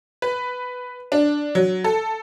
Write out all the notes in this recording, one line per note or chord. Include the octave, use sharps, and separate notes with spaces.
B4
D4
F#3
A4